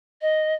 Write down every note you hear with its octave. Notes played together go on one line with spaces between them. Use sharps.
D#5